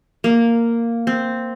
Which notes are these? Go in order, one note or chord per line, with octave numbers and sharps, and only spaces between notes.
A#3
C4